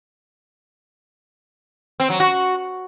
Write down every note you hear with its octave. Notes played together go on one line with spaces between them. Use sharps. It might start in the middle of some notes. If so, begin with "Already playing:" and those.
C4
F#3
F#4